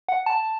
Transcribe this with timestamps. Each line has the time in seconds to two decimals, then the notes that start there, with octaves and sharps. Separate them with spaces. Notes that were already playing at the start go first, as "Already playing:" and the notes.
0.09 F#5
0.26 A5